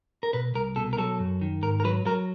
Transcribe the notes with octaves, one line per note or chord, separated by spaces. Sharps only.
A#4
B2 B4
C2 A#4
B2 A4
A#4
F#3 A4
F#2
D#3
G#2 A#4
A#4
F#3 B4
F#3 A#4